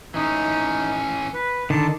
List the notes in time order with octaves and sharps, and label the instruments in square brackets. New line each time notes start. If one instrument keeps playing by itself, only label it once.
[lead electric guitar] E3 C#4 [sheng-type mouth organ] D#4
[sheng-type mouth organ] B4
[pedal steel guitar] D3 D#3 [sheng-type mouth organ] A5